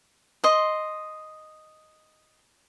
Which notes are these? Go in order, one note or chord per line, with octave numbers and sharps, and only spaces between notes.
D#5 C6